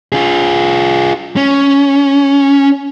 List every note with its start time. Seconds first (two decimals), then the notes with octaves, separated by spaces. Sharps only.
0.12 F4 G#4
1.37 C#4